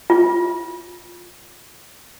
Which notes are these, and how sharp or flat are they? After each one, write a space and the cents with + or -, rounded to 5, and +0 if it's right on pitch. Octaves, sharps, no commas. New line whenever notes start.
F4 +10